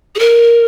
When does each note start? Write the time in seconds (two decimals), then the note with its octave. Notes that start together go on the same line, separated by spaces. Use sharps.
0.15 G#4
0.19 A#4